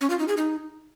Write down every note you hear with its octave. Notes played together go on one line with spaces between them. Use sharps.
C#4
F4
D#4
G#4
D#4